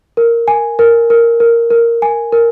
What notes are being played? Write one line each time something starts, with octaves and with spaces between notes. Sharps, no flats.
A#4
G#5
A#4
A#4
A#4
A#4
G#5
A#4